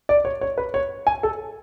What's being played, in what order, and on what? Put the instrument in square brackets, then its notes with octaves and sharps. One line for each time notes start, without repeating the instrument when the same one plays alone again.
[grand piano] D5
C#5
C#5
B4
C#5
G#5
A4